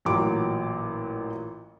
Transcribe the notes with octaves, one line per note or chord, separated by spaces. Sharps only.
A1 A#2 F#3 D6